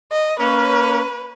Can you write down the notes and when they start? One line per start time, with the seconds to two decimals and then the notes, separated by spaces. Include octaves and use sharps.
0.12 D#5
0.39 A#3 C#4 B4